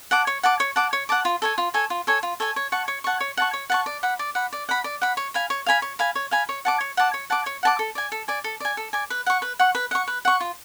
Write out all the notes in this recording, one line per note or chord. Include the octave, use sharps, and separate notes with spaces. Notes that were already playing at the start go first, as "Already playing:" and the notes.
F#5 A5 D6
C#5
F#5 A5 D6
C#5
F#5 A5 D6
C#5
F#5 A5 D6
F4
A4 C#5 G#5
F4
A4 C#5 G#5
F4
A4 C#5 G#5
F4
A4 C#5 G#5
C#5
F#5 A5 C#6
C#5
F#5 A5 C#6
C#5
F#5 A5 C#6
C#5
F#5 A5 C#6
D5
F#5 B5
D5
F#5 B5
D5
F#5 B5
D5
F#5 B5
C#5
F5 G#5 B5
C#5
F5 G#5 B5
C#5
F5 G#5 B5
C#5
F5 G#5 B5
C#5
F#5 A5 D6
C#5
F#5 A5 D6
C#5
F#5 A5 D6
C#5
F#5 A5 D6
A4
D5 G#5
A4
D5 G#5
A4
D5 G#5
A4
D5 G#5
B4
F#5 C#6
B4
F#5 C#6
B4
F#5 C#6
B4
F#5 C#6
F4